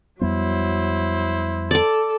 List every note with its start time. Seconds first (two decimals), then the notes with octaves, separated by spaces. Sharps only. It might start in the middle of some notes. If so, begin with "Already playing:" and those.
0.21 F2 F#3 G3 B3 E4 C5
1.71 A4 D5 D6